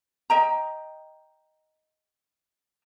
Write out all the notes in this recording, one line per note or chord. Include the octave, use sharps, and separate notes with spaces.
D#5 G5 A#5